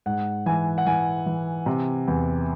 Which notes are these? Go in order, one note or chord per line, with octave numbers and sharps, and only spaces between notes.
G#2 F#5
E3 G#5
F#5
E3 G#5
E3
C3
E2